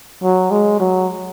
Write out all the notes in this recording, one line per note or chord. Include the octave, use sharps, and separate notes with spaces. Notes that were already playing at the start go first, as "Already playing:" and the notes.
F#3
G#3
F#3